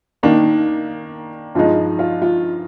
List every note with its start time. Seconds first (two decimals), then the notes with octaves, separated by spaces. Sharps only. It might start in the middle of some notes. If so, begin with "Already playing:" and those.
0.23 D#3 A#3 D4 D#4
1.55 G2 F3 G#3 D#4 F4
1.99 F4
2.22 F4